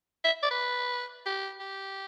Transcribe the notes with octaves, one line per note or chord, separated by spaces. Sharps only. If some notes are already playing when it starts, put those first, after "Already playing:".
E5
D5
B4
G4
G4